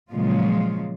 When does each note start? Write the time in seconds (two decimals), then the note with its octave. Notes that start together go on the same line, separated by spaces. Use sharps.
0.12 A#2 C#3 F3 F#3 G#3 F4